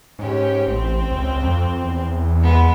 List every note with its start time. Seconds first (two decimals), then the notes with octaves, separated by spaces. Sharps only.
0.19 G#2 C#4 G4
0.67 A1 C4
1.11 C#2
1.42 F2
1.81 E2
2.41 G#3 B3